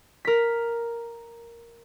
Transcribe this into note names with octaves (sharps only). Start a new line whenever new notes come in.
A#4 B6